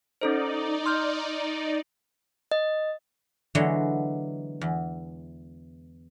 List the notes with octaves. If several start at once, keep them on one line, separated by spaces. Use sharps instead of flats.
C#4 D#4 A4 C5 D5
C6 F6 G6
D#5
D3 E3 F#3 G#3 B3
E2